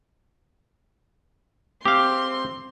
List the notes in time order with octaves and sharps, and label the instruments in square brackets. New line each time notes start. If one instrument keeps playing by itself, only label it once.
[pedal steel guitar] C4 [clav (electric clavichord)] G4 F5 [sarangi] C6 [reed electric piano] D6